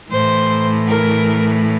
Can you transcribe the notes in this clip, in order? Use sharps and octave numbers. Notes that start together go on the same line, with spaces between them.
A2 E3 C5
A#4